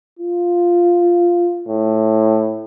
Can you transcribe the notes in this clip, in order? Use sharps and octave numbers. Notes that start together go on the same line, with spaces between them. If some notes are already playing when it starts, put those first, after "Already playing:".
F4
A2